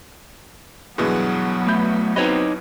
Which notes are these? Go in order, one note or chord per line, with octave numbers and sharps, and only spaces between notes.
G2 B2 E3 F#3 G#3 B3
A3 E5 B5 G6
C4 D#4 F#4 B4 C#5 D#5